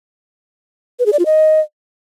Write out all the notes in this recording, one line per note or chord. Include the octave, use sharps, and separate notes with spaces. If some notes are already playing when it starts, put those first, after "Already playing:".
B4
G#4
D5
F4
D#5